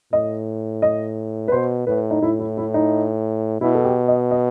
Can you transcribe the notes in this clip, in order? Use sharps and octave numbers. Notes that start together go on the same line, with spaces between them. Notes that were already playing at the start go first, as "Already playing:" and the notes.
A2 D#5
D#5
B4
B2 C5
A2 B4
D#4
A2 E4
E4
E4
D#4
B2 E4
A4
G4
D#5
D#5